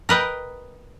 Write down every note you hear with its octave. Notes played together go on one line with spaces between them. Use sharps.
A#4 B4 D#5 G5